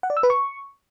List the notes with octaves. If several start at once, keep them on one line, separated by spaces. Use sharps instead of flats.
F#5
D5
E6
B4
C#6